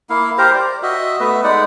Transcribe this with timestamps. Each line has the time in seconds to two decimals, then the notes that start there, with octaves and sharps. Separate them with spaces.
0.10 A#3 E4 F5
0.38 G4 A#4 C5 A#5
0.54 D5
0.83 F#4 D#5 E5
1.20 A3 B3 B4 E5
1.44 G#3 D#4 D5 F#5